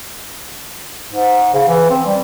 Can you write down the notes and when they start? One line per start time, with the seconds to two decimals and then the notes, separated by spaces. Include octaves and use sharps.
1.12 G#2
1.54 C#3
1.68 E3
1.90 C4
2.06 G3